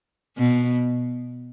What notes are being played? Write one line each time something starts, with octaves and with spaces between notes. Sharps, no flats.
B2